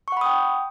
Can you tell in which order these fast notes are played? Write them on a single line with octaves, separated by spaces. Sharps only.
C#6 F#5 B5 D#6 G5